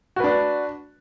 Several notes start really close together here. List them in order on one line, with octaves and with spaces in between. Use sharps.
F#4 B4 D4